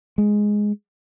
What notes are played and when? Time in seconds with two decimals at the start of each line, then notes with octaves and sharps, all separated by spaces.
0.18 G#3